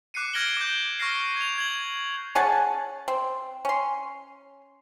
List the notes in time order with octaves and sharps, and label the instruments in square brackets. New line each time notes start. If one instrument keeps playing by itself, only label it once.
[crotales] D6 F#6 C7 C#7 D#7
F6 G#6 A#6 D7 F#7 G7
D6 G6
C#6 F6 A#6 C7
G#6 F7
G#6 F#7
[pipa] C#4 G#4 F#5 A5
C4
C#4 C6